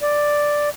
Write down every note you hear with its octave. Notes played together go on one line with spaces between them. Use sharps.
D5